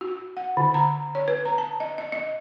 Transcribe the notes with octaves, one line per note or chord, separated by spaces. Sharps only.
F#4
F#5
D3
A#5
C#5
B4
A#5
A5
D#5
D#5
D#5